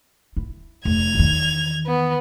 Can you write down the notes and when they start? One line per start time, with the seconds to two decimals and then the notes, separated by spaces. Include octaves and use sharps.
0.37 E4
0.85 F1 G#6 F7
1.15 E2 D#3
1.86 B3